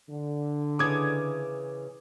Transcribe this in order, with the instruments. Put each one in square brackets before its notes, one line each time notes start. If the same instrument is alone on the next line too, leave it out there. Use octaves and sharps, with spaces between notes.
[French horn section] D3
[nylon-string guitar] C#3 E3 [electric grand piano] D6 D#6 G#6